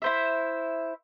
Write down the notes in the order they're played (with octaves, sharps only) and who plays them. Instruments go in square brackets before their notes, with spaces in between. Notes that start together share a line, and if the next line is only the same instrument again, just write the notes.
[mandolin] E4 C5 E5